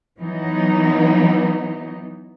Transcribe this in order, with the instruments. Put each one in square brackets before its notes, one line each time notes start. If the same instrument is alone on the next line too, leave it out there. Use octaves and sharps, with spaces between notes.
[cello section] E3 F#3 B3 D#4